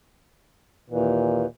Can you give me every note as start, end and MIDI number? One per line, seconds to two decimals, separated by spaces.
0.90 1.46 39
0.90 1.46 46
0.90 1.46 52